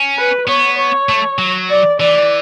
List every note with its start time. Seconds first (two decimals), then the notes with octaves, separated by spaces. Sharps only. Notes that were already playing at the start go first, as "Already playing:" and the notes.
Already playing: C#4
0.18 B4
0.48 B3 C#5
0.78 C#5
1.09 A3
1.38 F#3
1.69 D5
2.00 E3 D5